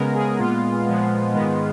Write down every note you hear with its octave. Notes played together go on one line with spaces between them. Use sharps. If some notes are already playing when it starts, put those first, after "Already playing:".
Already playing: C#3 G#3 B3 A#4
G#4
A#2 G#3 B3 F4
A#2 F3 G#3 B3
G#2 D#3 G#3 B3